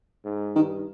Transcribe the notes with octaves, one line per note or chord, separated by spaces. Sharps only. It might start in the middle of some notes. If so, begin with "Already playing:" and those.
G#2
G2 D#3